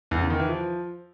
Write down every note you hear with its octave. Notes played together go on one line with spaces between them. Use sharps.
E2
C#3
D#3
E3
F3